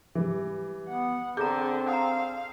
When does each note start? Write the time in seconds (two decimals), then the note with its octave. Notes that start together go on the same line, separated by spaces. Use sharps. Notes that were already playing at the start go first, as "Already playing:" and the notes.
0.15 E3 G3
0.88 B3 F#5
1.37 D3 C4 G#4 A4 A#5 G6
1.89 F5 A#5 D#6